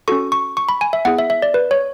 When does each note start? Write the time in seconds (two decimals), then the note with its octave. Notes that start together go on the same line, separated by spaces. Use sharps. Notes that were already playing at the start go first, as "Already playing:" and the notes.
0.08 C#4 F#4 A4 C#6
0.32 C#6
0.57 C#6
0.69 B5
0.81 G#5
0.93 E5
1.05 B3 E4 G#4 F#5
1.18 E5
1.30 E5
1.42 D5
1.54 B4
1.71 C#5